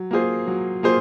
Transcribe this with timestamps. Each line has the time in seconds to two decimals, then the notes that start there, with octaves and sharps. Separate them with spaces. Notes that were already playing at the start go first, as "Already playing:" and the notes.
Already playing: F#3
0.11 A#3 F4 G#4 C5
0.47 F#3
0.83 A#3 F4 G#4 C5